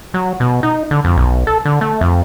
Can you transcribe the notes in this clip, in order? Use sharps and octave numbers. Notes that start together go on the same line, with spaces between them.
F#3
B2
D#4
D3
F2
B1
A4
D3
A3
F2